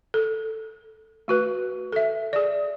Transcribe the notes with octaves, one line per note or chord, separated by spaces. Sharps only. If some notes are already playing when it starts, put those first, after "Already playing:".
A4
A3 F#4 B4
A4 E5
G#4 D5